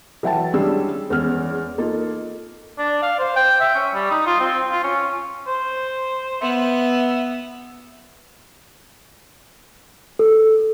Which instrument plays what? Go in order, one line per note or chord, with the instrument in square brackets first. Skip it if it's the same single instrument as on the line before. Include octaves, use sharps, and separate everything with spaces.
[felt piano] E3 F#3 E5 G5 A5
G3 G#3 C#4 D4 G#4 E6
E2 G#3 C#4 F6
A#3 D#4 F4 A4
[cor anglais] D4
F5
C5
G5
E5
C#4
G3
D#4
F4
C4
F4
C#4
C5
[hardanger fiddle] B3 [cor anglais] E5
[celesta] A4